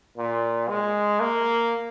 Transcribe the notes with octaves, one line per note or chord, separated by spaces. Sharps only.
A#2
G#3
A#3